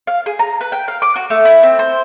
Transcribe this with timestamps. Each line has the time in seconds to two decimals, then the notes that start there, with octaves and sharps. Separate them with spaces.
0.07 F5
0.26 G#4
0.39 A#5
0.61 B4
0.72 G5
0.88 F5
1.02 D6
1.16 F#4
1.30 A3
1.45 E4
1.63 C4
1.79 C5